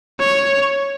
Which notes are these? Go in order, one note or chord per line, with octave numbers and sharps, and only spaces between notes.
C#5